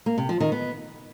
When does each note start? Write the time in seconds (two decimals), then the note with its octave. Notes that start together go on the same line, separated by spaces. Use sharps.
0.06 A#3
0.18 C3
0.29 F3
0.40 D#3
0.52 B3